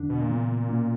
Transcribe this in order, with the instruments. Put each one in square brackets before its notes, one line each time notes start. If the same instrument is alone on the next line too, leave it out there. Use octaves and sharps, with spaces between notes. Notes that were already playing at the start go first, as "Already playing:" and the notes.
Already playing: [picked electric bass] E2 D3 D4
[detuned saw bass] B2
A#2
[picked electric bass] C#3 E3 B3
B2 A#3 C#4